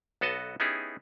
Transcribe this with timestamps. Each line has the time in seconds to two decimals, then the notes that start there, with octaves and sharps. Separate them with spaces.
0.21 B1 B3 F#4 A4 D#5 A5
0.60 B3 C#4 D#4 E4 G4 G#4